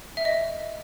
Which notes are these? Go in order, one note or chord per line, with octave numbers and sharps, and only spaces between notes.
E5
D#5